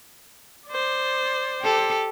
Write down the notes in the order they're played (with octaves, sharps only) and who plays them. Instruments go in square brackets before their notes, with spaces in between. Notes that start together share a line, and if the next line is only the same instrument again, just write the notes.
[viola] C5 D5
[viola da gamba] G4 A4